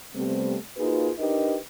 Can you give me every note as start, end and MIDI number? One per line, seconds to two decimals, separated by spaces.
0.15 0.56 48
0.15 0.56 55
0.15 0.56 57
0.15 0.56 59
0.15 0.56 60
0.77 1.10 58
0.77 1.10 63
0.77 1.10 65
0.77 1.10 66
0.77 1.10 68
0.77 1.10 71
1.19 1.57 62
1.19 1.57 63
1.19 1.57 67
1.19 1.57 70
1.19 1.57 71
1.19 1.57 75